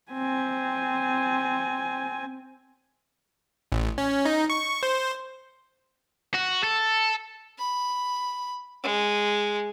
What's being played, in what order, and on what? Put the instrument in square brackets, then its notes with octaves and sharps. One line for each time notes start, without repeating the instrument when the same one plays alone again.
[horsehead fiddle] C4 G#5
[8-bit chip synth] A1
C#4
D#4
C#6
C5
[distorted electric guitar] F#4
A4
[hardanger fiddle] B5
G#3